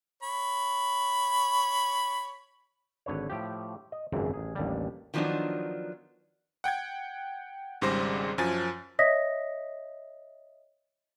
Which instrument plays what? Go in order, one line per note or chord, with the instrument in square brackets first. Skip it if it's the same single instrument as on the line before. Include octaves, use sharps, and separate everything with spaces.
[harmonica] C#5 B5
[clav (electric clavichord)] G#1 D3 B4 C#5
A2 F3 G4
D#5
G#1 C#2 F#2 E3 C4
A1 G#4
A1 D#2 D3 G3
[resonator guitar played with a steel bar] D#3 F3 F#3 B3 D4 D#4
[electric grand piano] F#5 G5 G6 G#6
G#1 G#2 C#3 G3 C5 A#6
F#2 F3 G#5 A6
[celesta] C#5 D#5 E5 D#6 A#6 B6